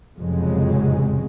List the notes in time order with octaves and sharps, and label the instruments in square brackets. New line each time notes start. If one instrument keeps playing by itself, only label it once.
[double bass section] F1 F2 A2 C#3 F#3 G#3